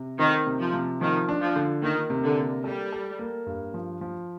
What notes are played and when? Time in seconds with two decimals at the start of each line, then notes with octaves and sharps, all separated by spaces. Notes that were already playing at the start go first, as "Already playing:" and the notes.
Already playing: C3
0.19 D#3 C4
0.47 C3
0.60 F3
0.73 C3
1.01 D#3 F3
1.29 D4
1.42 F3
1.56 D3
1.82 D#3 A#3
2.10 C3
2.23 D3
2.37 A#3
2.64 G3 A4
2.92 A4
3.19 A#3
3.46 G2
3.74 F3
4.01 F3